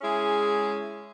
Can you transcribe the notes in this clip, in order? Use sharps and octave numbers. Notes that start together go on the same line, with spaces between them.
G#3 C#4 E4 G#4